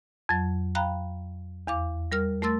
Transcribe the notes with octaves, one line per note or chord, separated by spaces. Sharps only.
F2 F#3
F5 G5 A#5 B5 F#6
E2 F5 D6
G3 A#4 F6
A3 A#4 C6 E6 A6